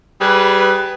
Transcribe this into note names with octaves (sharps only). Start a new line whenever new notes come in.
G3 G#4 B4